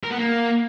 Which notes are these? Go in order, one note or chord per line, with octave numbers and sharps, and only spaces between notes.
A#4
B3
A#3